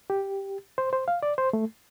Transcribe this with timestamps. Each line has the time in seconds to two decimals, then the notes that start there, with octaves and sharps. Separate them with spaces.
0.10 G4
0.78 C5
0.93 C5
1.08 F5
1.23 D5
1.38 C5
1.53 A3